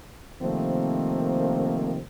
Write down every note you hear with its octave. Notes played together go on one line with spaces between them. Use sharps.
C3 D#3 F3 A3 A#3 C4